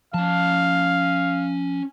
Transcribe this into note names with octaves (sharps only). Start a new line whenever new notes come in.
F3 C#4 F5 A5